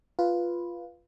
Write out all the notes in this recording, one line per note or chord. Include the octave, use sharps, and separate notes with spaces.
F4 B4